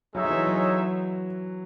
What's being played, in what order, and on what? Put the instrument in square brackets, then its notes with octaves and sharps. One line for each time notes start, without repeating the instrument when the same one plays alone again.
[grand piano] F#3 [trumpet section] G#3 D#4 A4 C#5 E5
[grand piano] F#3
E3
F#3